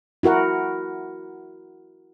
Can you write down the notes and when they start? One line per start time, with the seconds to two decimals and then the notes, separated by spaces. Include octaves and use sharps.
0.23 E4 F#4 A#4 F#5